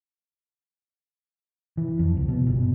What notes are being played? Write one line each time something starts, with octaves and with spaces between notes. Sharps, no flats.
E3
F2
C#2
B2
G1
B2